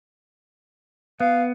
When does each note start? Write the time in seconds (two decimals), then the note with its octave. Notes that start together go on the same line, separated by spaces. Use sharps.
1.20 B3 F5